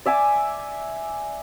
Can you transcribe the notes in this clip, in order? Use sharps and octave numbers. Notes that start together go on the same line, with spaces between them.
D5 E5 G#5 D6